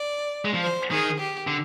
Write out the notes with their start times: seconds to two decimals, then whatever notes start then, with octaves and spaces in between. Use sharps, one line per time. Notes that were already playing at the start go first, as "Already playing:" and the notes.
Already playing: D5
0.45 G#3
0.54 F3
0.63 C5
0.91 D#3 G#4
1.19 G4
1.47 D3